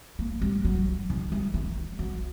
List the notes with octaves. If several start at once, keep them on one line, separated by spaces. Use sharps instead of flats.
A#3
G3
F#3
D#3
G3
D#3
F#3